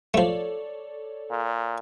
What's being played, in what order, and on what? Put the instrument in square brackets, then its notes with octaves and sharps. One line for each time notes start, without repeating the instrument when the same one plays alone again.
[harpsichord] F3 A3 [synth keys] A4 C#5 D5
[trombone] A#2